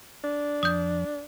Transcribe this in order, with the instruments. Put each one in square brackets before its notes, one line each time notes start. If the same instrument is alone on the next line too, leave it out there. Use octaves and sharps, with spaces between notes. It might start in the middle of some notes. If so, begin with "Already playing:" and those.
[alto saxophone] D4
[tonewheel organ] F2 [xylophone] D#6 G6